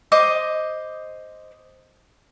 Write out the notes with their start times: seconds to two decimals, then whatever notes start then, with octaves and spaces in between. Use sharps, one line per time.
0.12 C5 D#5 D6